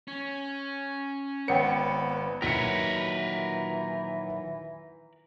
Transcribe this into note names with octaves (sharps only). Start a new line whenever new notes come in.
C#4
G#1 B3 C#5 F#5 G5 C#7
A#2 D#3 E3 F#3 A#4 B4 B6 C#7